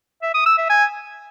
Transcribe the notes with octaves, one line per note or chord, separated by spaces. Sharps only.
E5
D#6
E6
E5
G#5